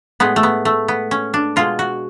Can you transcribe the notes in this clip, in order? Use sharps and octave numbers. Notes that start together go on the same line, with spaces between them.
A2 G#3 B3
A3
B3
A3
B3
C#4
D4
B2 G#3 F4
F#4